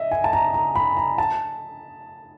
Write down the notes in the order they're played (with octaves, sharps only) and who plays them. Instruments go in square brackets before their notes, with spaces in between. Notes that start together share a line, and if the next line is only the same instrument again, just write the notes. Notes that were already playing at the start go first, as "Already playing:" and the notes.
Already playing: [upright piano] D#5 E5
G#5
A5
A#5
A#5
B5
A#5
A5